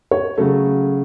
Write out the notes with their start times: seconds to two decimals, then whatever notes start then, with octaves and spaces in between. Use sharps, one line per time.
0.11 C#5
0.38 C#3 F#3 A3 A4